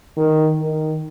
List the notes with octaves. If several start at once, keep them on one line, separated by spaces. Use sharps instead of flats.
D#3
D#3